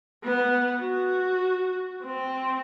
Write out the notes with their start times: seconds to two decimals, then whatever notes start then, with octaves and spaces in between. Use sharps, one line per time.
0.24 B3
0.79 F#4
2.03 C4